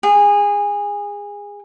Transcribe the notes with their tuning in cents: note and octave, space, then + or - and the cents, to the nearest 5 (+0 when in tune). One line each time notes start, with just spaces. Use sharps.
G#4 -25